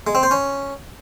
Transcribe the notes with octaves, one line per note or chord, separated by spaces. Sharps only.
G#3
C4
C5
C#4